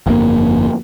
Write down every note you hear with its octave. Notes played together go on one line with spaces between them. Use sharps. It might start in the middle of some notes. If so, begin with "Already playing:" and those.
G1 F2 G#2 A#3